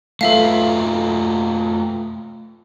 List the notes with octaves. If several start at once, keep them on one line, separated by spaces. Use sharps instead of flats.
A3 F4 A4 B4 E5 F5